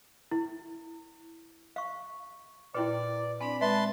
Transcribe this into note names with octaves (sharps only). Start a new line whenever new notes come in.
E4
F5 C#6
A#2 E4 F#4 B4 D5 G5
C4 D4 D5 G#5 B5
G#3 B4 E5 A5 C6